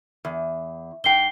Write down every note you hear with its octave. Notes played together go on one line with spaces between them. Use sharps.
E2
G#2 G5 C7 G7